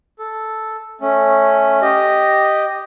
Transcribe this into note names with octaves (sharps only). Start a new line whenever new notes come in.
A4
A3 C#4
G4 D#5